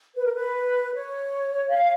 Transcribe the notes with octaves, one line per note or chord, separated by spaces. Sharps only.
B4
A#4
B4
C#5
F5